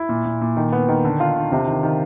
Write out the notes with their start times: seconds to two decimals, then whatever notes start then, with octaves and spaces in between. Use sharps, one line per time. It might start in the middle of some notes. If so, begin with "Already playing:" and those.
Already playing: E4
0.09 A#2
0.25 A#2
0.41 A#2
0.57 D#3
0.72 B3
0.88 D#3
1.05 D3
1.20 F4
1.36 D3
1.52 C3
1.68 D#3
1.83 D#3